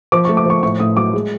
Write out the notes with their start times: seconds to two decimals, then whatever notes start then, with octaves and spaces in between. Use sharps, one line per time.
0.12 F3 D6
0.25 C#6
0.29 A3
0.37 D6
0.46 F3 C#6
0.63 A2 C#6
0.80 A2 D#6
0.97 F#3 D6
1.14 G#3